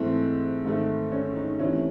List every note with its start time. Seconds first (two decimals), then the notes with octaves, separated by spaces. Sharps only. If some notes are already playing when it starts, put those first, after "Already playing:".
Already playing: G#2 E3 A3 C4
0.65 G#2 D#3 A3
1.12 C#4
1.36 D#4
1.59 C3 E3 A3 C#4